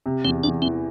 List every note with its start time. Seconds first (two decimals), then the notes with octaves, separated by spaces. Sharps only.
0.06 C3
0.24 E2 C4
0.43 E2 D4
0.62 E3 C4